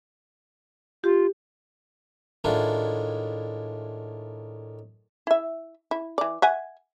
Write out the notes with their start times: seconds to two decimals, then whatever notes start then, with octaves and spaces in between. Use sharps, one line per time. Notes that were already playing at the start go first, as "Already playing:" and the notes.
1.04 F4 G4
2.44 A2 D#3 G#3 D4 E4 F4
5.27 E4 E5
5.91 E4
6.18 E3 D5
6.42 E5 F#5 G#5